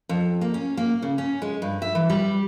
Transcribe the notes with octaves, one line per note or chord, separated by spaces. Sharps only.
F2
A#3
C#4
A#3
C#3
C#4
G#3
G2
E5
E3
G3